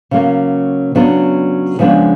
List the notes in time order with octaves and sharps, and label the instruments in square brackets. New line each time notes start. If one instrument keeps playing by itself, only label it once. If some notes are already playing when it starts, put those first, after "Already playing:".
[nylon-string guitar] C#3 F#3 A#3
C#3 F#3 B3 D4
C#3 F3 G#3 B3 D4